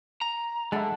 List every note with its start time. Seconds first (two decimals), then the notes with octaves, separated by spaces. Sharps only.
0.21 A#5
0.72 D3 G#3 E5 F#5 A5 B5